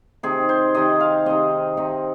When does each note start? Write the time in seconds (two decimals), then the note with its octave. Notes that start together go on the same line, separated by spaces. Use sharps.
0.23 C3 D#3 C4 G#4
0.49 C5
0.74 C3 D#3 C4 D#5
1.00 F5
1.26 C3 D#3 C4 D#5
1.77 C3 D#3 C4 D#4